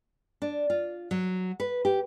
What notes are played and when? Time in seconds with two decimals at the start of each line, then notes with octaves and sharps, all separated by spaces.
0.42 D4
0.70 F4
1.11 F#3
1.60 B4
1.85 G4